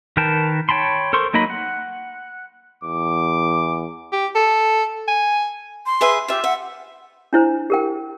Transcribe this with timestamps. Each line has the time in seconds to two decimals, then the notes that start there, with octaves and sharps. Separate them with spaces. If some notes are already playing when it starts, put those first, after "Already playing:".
0.17 D#3 A#4 B4 G5 A5
0.69 C#5 G5 A5 B5 C6
1.13 A4 A#4 C5 C6 C#6
1.34 F#3 A#3 D#4 D#5 B5
1.50 F#5
2.84 E2 D6
4.12 G4
4.35 A4
5.08 G#5
5.86 C6
6.01 G#4 B4 E5
6.28 F4 G4 E5
6.44 E5 F#5
7.33 D4 E4 C5 A#5
7.70 G4 A#4 G5